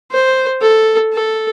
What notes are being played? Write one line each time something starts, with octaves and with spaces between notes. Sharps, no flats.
C5
A4
A4